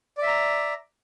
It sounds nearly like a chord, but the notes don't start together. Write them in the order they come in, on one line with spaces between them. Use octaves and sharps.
D5 E5 A#5